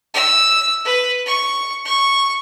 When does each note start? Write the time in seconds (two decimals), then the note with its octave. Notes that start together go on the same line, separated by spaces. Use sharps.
0.14 E6
0.85 B4
1.26 C#6
1.85 C#6